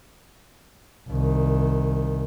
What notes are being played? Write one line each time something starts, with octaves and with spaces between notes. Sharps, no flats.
C2 D#3